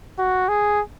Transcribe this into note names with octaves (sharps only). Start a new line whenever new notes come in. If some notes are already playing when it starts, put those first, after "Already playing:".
F#4
G#4